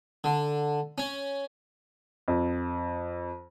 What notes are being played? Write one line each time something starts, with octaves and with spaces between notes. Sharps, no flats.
D3
C#4
F2